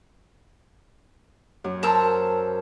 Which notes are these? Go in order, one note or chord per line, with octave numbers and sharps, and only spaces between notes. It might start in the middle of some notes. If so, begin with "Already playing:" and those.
F#2
A#4 C5 A5 A#5 E6